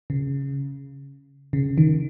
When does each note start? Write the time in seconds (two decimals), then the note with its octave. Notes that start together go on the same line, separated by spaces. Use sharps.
0.10 C#3
1.53 C#3
1.78 D#3